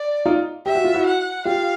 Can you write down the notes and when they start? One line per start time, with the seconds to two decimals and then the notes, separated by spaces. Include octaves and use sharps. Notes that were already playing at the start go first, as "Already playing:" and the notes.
Already playing: D5
0.26 D#4 F4
0.66 G4 E5
0.75 F#4
0.84 F4
0.94 E4 F#4
1.06 F#5
1.45 F4 G4 F5